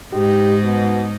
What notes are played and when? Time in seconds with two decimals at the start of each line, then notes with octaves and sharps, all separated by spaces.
0.13 G#2 D#4 G4
0.63 B2